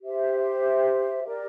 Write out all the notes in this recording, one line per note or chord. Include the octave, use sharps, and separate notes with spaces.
G4 C5 E5
G4 A#4 D5